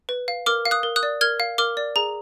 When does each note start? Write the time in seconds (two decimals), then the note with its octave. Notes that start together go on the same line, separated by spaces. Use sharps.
0.09 B4
0.28 F5
0.46 A#4 D6 F6
0.65 F5
0.71 D#6 F#6
0.83 A#4
0.96 D#6 F#6
1.03 D5
1.21 A#4 F6 G#6
1.40 F5
1.58 A#4 D6 F6
1.77 D5
1.96 G#4 A#5